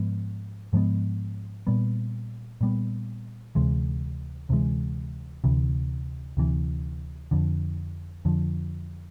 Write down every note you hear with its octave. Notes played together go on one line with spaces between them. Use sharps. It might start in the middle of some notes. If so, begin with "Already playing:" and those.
Already playing: G#2 F3 G#3 B3
G#2 F3 G#3 B3
A#2 G3 B3
A#2 G3 B3
D2 C3 E3 G#3
D2 C3 E3 G#3
D2 C3 E3
D2 C3 E3
F2 D3 F3
F2 D3 F3